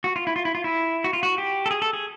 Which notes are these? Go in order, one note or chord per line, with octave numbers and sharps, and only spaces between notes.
F#4
F4
E4
F4
E4
F4
E4
F#4
F4
F#4
G4
A4
G#4
A4
G#4